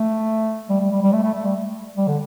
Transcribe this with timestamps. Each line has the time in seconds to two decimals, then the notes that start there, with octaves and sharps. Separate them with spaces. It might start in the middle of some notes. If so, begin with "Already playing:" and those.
Already playing: A3
0.70 G3
0.81 G3
0.92 G3
1.02 G3
1.13 A3
1.23 A3
1.34 A3
1.45 G3
1.97 G3
2.08 D3